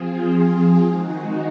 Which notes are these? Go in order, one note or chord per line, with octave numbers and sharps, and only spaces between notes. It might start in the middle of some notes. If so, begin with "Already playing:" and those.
Already playing: F3 C4 F4 G#4
D#3 G#3 D#4 F#4